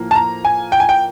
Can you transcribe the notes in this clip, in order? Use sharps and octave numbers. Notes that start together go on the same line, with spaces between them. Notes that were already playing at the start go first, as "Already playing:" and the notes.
Already playing: A2 F3 A#3
A5
A#5
G#5
G5
G#5
G5